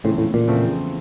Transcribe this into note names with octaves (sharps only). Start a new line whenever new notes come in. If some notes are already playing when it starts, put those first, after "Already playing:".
E2 A2 C#3 F3 A3 C4
A2
A#2
E2 C#3 F3 A3 C4